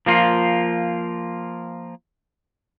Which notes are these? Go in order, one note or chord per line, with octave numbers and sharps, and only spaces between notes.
F3 A#3 F4